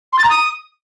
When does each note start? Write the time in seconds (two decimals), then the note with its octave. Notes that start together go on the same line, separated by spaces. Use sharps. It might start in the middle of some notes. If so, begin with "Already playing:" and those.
0.13 C6
0.18 A6
0.24 A#5
0.30 D#6